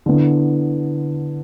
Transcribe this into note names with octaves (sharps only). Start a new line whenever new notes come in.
D3 B3 E4